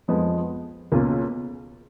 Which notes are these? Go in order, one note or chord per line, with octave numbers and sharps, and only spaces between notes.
F2 F3 G#3 B3
C#2 B2 A#3 C#4 F4